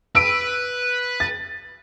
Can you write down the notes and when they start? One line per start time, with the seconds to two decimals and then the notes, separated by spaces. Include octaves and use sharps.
0.15 B4 E6 D7
1.20 A6